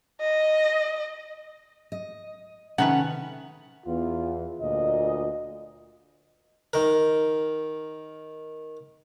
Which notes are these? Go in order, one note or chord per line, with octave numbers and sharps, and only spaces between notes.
D#5
D#5
C3 D#3 C#4 A4 B4 F#5
E2 F4
D2 A#2 D#5
D#3 A#4